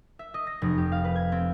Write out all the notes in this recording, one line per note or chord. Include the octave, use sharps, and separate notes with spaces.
E5
D#5
A#6
F1
G4
F5
B4
G#6
C4